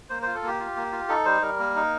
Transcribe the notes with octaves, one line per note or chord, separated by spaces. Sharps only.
A#3 C5
F4 C5
A4
A#3 G4
F4
A#3
F4
D#4 A4
G3 C5
G3 A#4
A#3
D#4